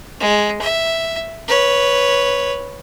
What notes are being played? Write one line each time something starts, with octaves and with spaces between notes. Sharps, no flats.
G#3
E5
B4 C#5